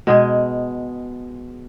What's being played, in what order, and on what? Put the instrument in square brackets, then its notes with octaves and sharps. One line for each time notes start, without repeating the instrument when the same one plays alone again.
[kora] B2 G#3 G#4